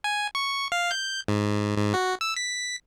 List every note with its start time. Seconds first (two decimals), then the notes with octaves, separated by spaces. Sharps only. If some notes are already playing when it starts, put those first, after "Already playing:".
0.04 G#5
0.35 C#6
0.72 F5
0.91 G6
1.28 G#2
1.77 G#2
1.94 F#4
2.21 E6
2.36 B6